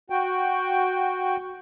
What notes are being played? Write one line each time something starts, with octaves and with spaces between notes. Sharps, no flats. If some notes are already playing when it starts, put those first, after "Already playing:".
F#4 G5